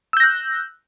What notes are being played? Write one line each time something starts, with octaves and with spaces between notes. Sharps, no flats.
E6 F#6 G6 A#6